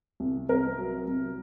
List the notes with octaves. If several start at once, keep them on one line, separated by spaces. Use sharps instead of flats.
C2
C2 A#4
F#3
C2